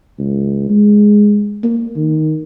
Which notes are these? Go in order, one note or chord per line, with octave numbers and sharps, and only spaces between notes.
C#2
G#3
A#3
D#3